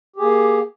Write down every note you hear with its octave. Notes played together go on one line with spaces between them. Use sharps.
A#3 G4 G#4